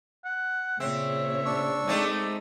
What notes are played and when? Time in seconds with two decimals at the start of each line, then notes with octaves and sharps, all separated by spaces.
0.25 F#5
0.80 A#2 C#3 C4 C#5 E5
1.46 D4 C#6 E6
1.88 G#3 A3 C4 D#4 D5